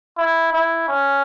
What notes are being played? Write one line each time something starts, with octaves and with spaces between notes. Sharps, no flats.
E4
E4
C#4